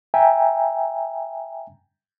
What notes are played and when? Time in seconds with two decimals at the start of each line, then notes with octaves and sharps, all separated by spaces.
0.14 E5 G5 G#5 A#5